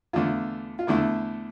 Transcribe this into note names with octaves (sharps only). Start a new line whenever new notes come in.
E2 D3 A3 F4
F4
E2 D3 A3 E4